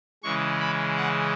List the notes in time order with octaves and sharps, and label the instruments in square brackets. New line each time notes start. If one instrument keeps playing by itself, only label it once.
[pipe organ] C#3 E3 G#3 C#6
B5
F#5